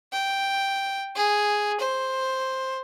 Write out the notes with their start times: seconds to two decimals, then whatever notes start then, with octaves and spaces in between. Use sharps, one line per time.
0.12 G5
1.15 G#4
1.79 C5